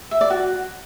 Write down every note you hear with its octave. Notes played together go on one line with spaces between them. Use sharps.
E5
D5
F#4